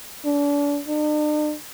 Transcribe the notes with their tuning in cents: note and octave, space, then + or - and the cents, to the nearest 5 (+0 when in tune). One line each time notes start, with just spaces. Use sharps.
D4 -35
D4 +45